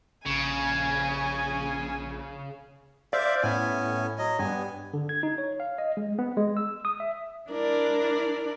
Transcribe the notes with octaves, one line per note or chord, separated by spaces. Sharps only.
A#1 C#3 G#5
C5 D5 E5 F5
A2 B3 C#4 G#5
F#3 D#5
G2 B3 G#5
D3
G#6
D#4
C#5
F5
D#5
G#3
B3
G#3
E6
D#6
E5
D4 E4 A#4 D5